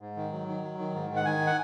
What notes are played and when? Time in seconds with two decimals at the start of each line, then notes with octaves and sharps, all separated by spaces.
0.01 G#2
0.16 D#3
0.32 F#3
0.48 D#3
0.63 F#3
0.79 D#3
0.95 G#2
1.10 D#3
1.16 F#5
1.25 D#3 G#5
1.47 F#5